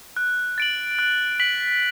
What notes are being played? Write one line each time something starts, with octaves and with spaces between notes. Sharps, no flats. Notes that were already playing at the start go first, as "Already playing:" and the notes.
F#6
A6 D7 F#7
F#6
B6 F#7